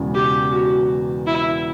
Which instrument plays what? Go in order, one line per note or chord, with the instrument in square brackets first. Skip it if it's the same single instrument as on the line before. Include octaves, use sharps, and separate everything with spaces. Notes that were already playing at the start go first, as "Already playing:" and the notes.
Already playing: [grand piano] E1 E2 C#3
[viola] G4
F#4
E4